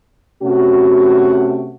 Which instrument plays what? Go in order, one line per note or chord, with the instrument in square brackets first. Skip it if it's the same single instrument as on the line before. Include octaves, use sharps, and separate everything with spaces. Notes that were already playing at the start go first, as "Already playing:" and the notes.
[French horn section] C3 A3 C#4 F#4